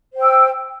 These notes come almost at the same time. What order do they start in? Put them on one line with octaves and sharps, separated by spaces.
C5 G5 E6